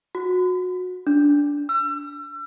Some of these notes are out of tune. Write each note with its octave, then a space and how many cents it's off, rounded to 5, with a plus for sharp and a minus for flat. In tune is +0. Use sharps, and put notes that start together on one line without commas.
F#4 -25
D4 -15
E6 +35